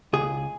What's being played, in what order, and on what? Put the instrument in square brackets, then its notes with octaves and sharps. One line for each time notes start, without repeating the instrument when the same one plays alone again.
[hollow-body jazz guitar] C#2 G#4